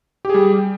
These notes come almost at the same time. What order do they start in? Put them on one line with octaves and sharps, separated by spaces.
G4 G#4 G3